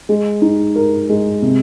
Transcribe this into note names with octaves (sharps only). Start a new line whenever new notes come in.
G#3
D#4
A#4
G#3
C3